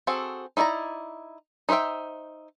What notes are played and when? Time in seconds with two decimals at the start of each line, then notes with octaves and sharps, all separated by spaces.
0.07 C4 F#4 G#4 A4
0.57 D#4 E4 D5 G5 A#5
1.69 D#4 B4 C5 E5 G5